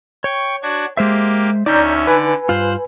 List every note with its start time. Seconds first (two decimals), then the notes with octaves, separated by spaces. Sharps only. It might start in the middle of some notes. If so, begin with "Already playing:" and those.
0.24 C#5 G5 C#6
0.63 D4 F#4 G#6
0.97 G#3 A#3 G4 C5 E5
1.66 D2 C#4 D#4 D5 E5 A#5 G6
2.07 D3 D4 B4 G#5
2.49 G2 F4 C5 F#6